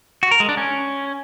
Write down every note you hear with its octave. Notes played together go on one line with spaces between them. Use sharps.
F#4
A#4
G#3
D4
C#4